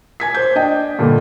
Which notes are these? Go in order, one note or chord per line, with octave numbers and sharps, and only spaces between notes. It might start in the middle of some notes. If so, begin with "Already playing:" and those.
G#5 G#6 B6
C5 G6
D4 D#5 G5
G2 A#2 D3